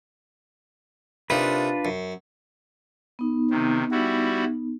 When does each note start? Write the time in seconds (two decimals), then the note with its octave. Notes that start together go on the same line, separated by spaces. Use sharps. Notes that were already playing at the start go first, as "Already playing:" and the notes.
1.30 C3 A#3 D4 D#4 F4 B4
1.85 F#2
3.19 B3 D#4
3.50 C3 D#3
3.92 G3 E4 F#4